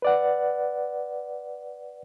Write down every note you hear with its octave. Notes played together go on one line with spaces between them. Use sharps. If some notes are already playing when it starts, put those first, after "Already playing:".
B4 D5 F#5